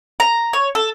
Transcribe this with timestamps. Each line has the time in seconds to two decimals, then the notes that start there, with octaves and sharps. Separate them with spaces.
0.20 A#5
0.53 C#5
0.75 A4